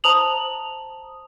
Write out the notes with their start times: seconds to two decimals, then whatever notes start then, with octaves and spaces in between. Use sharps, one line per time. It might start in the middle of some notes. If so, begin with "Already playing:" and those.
0.04 C5 A5 A#5 D#6 F7 F#7